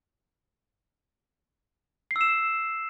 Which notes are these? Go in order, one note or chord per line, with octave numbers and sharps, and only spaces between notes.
C7
E6
E7